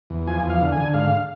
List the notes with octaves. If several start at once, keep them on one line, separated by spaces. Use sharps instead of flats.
E2
F3 G#5
E2
F5
D3
G#5
D3
G#2 F5